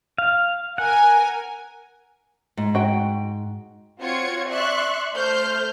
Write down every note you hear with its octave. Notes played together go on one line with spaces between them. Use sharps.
F5
A#4 F#5 G#5
G#2
F#4 G5
C4 F4 F#4 C#5 G#6 C#7
D5 E5 C6 C#6 F#6
A3 C5 F6 G6